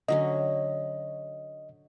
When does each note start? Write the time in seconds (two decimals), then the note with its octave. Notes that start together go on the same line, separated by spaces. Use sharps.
0.08 D3 F#3 C#4 D#5